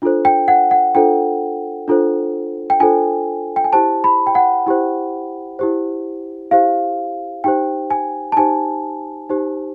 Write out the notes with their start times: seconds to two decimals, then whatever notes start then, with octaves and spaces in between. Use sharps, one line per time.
0.02 D4 F4 A4 C5
0.25 G5
0.48 F#5
0.71 F#5
0.95 D4 F4 A4 C5 G5
1.88 D4 F4 A4 C5
2.70 G5
2.80 D4 F4 A4 C5 G#5
3.56 G5
3.64 G#5
3.73 E4 G4 C5 A5
4.04 B5
4.27 G5
4.35 F#5
4.66 E4 G4 C5
5.59 E4 G4 C5
6.51 E4 G4 C5 F5
7.44 D#4 G4 C5 G5
7.90 G#5
8.32 A5
8.37 D#4 G4 C5 G#5
9.29 D#4 G4 C5